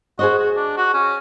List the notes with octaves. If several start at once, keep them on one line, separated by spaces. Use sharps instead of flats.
F#4 G#4 C5 D#5
F#4
D4
F#4
C#4